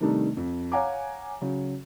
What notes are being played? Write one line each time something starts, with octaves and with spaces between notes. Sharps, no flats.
C3 D#3 G3 A3 D4 D#4
F2
C#5 F5 F#5 G#5 A#5 D6
C#3 F#3